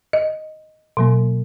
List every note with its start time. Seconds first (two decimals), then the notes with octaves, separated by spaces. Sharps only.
0.13 D#5
0.97 B2 F#3 A#3